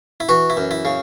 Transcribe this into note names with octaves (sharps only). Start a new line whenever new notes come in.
E4
E3 F#4
E4
F#2
E4
C#3